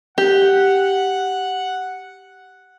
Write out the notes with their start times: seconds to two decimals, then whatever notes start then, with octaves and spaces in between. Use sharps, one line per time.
0.18 G4 F#5